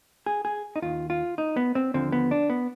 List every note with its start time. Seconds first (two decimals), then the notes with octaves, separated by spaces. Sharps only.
0.26 G#4
0.45 G#4
0.76 D#4
0.82 D#2 D#3 F4
1.10 F4
1.38 D#4
1.57 B3
1.75 C4
1.94 D#2 D3 F3 C4
2.12 B3
2.31 D4
2.50 B3